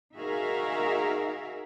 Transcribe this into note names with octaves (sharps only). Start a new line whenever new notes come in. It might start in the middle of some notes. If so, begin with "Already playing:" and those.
D#4 F#4 G#4 A#4 E5 F5